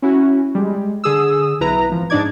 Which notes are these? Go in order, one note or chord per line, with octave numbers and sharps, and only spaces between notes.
C#4 E4 F#4
G3 G#3
D3 G#4 D#6 E6
B1 E4 B4 A#5
G#1 F3
G#2 D4 D#4 D5 D6 G#6